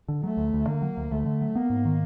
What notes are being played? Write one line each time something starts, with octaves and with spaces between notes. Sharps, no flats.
D3
F#3 A3
D2
D2
D3 A#3
F#3
D2
D2 A3
D3
F#3
A#3 B3
G#2
D#3